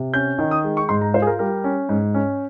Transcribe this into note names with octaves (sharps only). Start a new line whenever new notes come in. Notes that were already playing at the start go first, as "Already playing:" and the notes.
Already playing: C3
C#4 G6
D#3
D#6
G#3
C#6
G#2 C6
A#5
F4 C5
G#4
A#4
G3 A#4
C#4
G#2
C#4